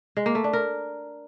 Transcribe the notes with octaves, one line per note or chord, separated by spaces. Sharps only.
G#3
A#3
A3
D4
A#4